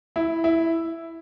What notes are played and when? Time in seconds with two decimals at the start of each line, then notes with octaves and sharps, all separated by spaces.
0.16 E4
0.44 E4